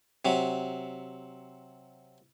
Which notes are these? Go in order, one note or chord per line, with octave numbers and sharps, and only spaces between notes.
C3 F#3